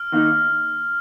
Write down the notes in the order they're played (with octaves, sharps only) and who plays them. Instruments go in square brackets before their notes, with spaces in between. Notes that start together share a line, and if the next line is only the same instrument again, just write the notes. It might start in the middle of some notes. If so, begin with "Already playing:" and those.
Already playing: [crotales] F6
[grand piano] D#3 A#3 D#4